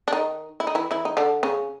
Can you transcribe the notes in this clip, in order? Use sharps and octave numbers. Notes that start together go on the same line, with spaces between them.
D4
D#3 D#4
E4
D#4
E3 E4
E3 E4
D#4
D3 D4
C#3 C#4